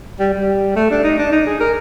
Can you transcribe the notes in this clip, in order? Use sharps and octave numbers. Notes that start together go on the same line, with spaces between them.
G3
G3
A3
D4
D#4
D4
D#4
G#4
A#4